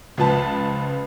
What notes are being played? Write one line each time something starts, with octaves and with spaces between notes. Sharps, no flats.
C#2 F3 B4 A5